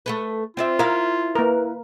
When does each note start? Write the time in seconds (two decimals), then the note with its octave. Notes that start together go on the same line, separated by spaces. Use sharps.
0.06 A3 A4 B4
0.57 C4 F4 D5 E5
0.79 E4 A#4 F5
1.35 A#3 A#4 B4